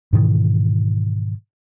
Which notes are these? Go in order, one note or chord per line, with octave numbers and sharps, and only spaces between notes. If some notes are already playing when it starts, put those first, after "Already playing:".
G#2 B2 D#3 E3